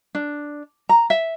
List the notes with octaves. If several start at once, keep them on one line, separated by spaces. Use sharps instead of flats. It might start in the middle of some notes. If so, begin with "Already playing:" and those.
D4
A#5
E5